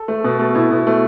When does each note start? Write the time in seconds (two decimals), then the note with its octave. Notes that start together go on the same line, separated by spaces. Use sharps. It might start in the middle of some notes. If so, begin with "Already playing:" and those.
Already playing: A4
0.08 A3
0.24 B2
0.39 A3
0.55 B2 E4
0.71 B2
0.87 A3